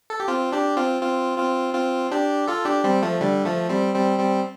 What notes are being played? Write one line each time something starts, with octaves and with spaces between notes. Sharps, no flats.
A4
G4
C4 F4
D4 G4
C4 F4
C4 F4
C4 F4
C4 F4
D4 G4
F4 A4
D4 G4
G3 C4
F3 A3
D3 G3
F3 A3
G3 C4
G3 C4
G3 C4